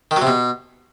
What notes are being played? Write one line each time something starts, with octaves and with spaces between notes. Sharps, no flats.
D#3
F#3
C3
B2